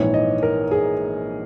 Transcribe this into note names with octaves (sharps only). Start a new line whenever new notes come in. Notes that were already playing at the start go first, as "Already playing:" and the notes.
Already playing: A#1 G#2 E3 C#5
D#5
A#4
G#4